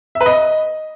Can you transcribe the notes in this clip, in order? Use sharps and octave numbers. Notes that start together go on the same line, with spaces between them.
E5
B4
D#5